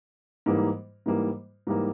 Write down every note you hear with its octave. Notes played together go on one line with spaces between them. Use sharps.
G#2 E3 G3 A#3
G#2 E3 G3 A#3
G#2 E3 G3 A#3